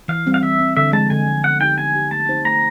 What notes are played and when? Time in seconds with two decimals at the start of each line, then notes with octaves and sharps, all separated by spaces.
0.08 E3 F5
0.26 G3 C4
0.34 F5
0.43 E3 E5
0.59 G3 C4
0.77 D3 E5
0.93 F3 G#3 A5
1.10 D3 G#5
1.28 F3 G#3
1.44 B3 F#5
1.61 D#4 G4 G5
1.77 B3 G#5
1.95 D#4 G4
2.11 A3 A5
2.28 C4 D#4 G4 C5
2.45 A3 A#5